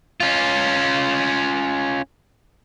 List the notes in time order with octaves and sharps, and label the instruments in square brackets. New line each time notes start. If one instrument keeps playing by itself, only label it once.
[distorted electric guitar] C#4 F4